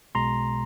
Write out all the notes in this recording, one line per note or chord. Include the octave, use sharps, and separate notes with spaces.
B1 B2 G#3 A#5 C6